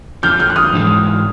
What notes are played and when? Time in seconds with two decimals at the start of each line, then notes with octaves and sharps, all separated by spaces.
0.23 F2 D3 F3 F6 G6
0.40 F6 G6
0.50 F#6
0.56 D#6 F6
0.73 G#2 E3 G#3